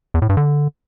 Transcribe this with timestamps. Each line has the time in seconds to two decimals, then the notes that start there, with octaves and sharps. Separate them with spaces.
0.14 E2
0.22 A2
0.29 G2
0.37 D3